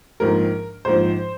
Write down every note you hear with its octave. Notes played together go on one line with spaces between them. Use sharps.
A#1 G#2 F3 A#4
A#1 G#2 F3 C5